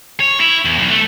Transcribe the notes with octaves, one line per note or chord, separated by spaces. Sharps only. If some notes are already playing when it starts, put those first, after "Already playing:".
C#5
E4
E2
B1
A3